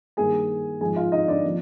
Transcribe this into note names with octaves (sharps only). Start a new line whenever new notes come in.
G2 D#3 G3 A#3 G#4 G#5
G#2 F3 G#3 G#4 G#5
F4 F5
D#4 D#5
D4 D5
F3 A#3